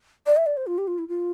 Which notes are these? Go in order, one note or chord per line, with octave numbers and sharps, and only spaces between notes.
D5
E5
D5
C5
F4
G4
F4
E4
F4